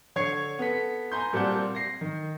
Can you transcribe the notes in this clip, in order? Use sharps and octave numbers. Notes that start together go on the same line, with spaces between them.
D3 C#5 G#6 C7 C#7
B3 A4 B6
G#5 A#5 C6 G6
A#2 G3 C4 F#5 A5 G6
A#6 C7
D#3